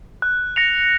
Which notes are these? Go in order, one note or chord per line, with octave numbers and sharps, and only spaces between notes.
F#6
A#6 C#7 F7